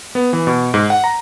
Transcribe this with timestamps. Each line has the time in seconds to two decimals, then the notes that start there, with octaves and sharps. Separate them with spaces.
0.15 B3
0.33 E3
0.47 B2
0.74 G#2
0.90 F#5
1.04 A#5